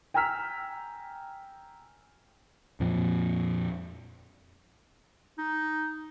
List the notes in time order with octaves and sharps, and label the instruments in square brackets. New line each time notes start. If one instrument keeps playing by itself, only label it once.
[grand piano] G5 G#5 A#5 E6 F6 B6
[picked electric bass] F2 A#2 F3 C4
[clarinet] D#4